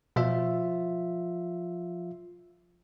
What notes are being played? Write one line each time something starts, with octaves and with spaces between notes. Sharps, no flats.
B2 F3 F4 E5